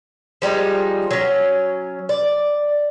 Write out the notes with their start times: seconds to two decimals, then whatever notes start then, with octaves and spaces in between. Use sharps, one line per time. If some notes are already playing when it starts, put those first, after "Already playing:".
0.42 F3 G3 G#3 D#4
1.11 F#3 C#4
2.09 D5